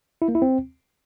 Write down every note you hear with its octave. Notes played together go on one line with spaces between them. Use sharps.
E4
A#3
E4
C4